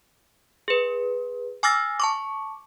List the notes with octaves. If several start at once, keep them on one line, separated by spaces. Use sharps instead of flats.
G#4 B4
G#5 D6 E6 F6 A6 A#6
A5 C#6 D6